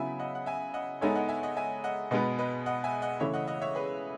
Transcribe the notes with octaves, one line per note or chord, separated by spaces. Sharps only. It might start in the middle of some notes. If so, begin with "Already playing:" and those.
Already playing: C#3 F#3 B3 E4 E5 G#5
D#5 F#5
F#5
E5 G#5
D#5 F#5
G#3 B3 D#4 A4 C#5 E5 G#5
D#5 F#5
E5 G#5
D#5 F#5
E5 G#5
D#5 F#5
B2 G#3 B3 B4 D#5
B4 D#5
D#5 F#5
E5 G#5
D#5 F#5
C#3 E3 A3 C#5 E5
D#5 F#5
D#5 F#5
C#5 E5
G#4 B4